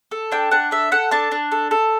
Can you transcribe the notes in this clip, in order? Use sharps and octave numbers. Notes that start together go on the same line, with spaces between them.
A4
D4 G5
D4 F#5
A4 E5
A4 F#5
D4 A5
D4
A4
A4